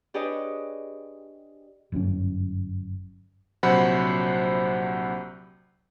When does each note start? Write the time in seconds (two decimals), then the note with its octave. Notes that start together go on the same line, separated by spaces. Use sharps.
0.14 D4 G4 G#4 B4 C#5 D#5
1.92 G1 F#2 C4 C#4
3.63 A#1 C3 F#3 C5 F#5 B5